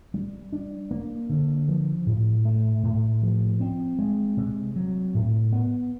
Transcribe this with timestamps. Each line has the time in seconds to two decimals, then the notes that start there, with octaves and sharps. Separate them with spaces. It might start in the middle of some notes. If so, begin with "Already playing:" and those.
0.14 G3
0.53 D4
0.91 A#3
1.29 D3
1.68 F3
2.06 A2
2.45 A3
2.83 A2
3.22 F3
3.60 C4
3.99 G#3
4.37 C3
4.76 F#3
5.14 A2
5.52 B3